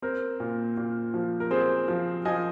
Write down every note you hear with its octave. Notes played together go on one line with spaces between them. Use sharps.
C4 A#4
A#2
A#2
F3
A#4
C4 G#4 C5
F3
F3 D#5 G#5